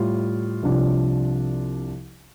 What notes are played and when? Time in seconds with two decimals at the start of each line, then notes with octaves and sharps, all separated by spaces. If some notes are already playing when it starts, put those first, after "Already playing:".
Already playing: A2 G3 F4
0.63 C2 C3 F3 D4 F4